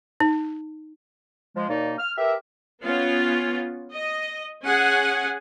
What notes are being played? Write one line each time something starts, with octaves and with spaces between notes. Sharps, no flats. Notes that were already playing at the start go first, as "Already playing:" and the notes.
D#4
F3 G#3
D#2 B2 A#3 D#4 D5
F6
G4 A#4 B4 E5
B3 C#4 F4
D#5
C#4 G#4 F#5 G#5